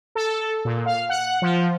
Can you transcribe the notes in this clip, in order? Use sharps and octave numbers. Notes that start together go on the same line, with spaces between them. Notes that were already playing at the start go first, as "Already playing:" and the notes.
A4
A#2
F5
F#5
F3